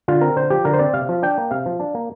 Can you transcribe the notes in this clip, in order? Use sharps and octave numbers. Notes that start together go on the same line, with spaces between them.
D3 F4
C4 A#4
D3 C5
F3 G4
D3 A#4
C5
C4 D5
C3 F5
F3
D4 G5
A#3
C3 F5
F3
D4
A#3